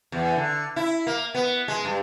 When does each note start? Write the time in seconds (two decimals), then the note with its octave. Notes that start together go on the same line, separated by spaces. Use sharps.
0.12 E2
0.36 D3
0.76 E4
1.07 A#3
1.34 B3
1.68 G#3
1.85 G2